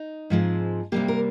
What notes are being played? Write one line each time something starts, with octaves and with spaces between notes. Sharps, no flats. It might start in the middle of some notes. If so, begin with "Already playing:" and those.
Already playing: D#4
G#2 F3 G#3 C4
C3 G3 A#3 G4
A#4